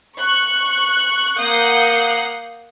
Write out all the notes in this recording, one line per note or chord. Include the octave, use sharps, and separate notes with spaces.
C#6 F#6
A#3 F5 F#5 D#6 G6 C7